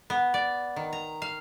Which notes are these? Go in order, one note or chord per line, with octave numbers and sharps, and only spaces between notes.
B3
D5
D#3
A#5
F5